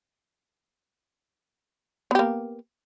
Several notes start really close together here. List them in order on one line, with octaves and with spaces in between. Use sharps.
B3 G4 A#3